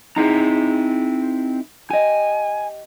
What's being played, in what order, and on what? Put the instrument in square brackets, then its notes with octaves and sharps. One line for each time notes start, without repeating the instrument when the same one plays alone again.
[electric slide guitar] C4 A#5 [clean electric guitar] D#4 E4 G#4
[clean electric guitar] G4 D#5 [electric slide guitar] G#5